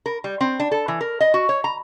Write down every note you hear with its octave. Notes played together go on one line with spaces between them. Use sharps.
A#4
G3
C4
D4
A4
E3
A#4
D#5
F#4
C#5
A#5